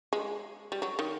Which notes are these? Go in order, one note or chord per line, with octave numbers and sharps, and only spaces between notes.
G#3
G3
F#3
D#3